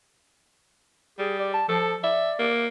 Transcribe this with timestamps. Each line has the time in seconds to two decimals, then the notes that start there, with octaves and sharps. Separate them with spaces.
1.19 G3 G#4
1.39 D5
1.54 A5
1.68 F3 A4
2.03 D5 E5
2.39 A#3